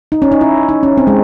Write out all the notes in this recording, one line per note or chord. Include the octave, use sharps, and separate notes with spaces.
D#4
C#4
D#4
E4
D#4
C#4
C4
G#3